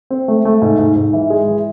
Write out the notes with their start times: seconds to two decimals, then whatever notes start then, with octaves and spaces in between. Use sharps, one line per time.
0.10 C4
0.28 A3
0.45 A3
0.62 G#2
0.79 G#2
0.96 G#2
1.13 E3
1.30 G#3
1.48 E3